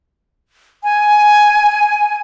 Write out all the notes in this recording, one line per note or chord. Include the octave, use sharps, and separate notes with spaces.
G#5